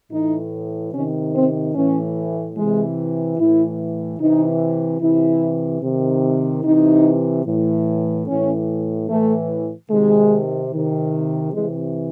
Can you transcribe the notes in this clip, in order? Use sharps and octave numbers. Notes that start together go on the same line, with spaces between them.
A2 E3 D#4
C3 D#3 C#4
C4
A2 E3 C#4
C3 E3 G#3
A2 E3 E4
C3 E3 D#4
C3 E3 E4
C3 D#3
C3 E3 D#4
A2 E3
A2 E3 C#4
A2 E3 A3
C3 D#3 G#3
C3 D#3
C3 E3 G#3